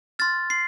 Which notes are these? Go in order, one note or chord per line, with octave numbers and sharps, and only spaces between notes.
C6 F6 A6
C6 C7